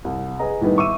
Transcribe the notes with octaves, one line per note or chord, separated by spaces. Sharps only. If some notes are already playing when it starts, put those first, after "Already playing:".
C2
G#4 B4 D#5 A#5
A2 D#3 G3 B3 D#4
E5 C#6 D6 E6 D#7